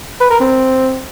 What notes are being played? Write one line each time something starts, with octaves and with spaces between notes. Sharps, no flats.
B4
A#4
C4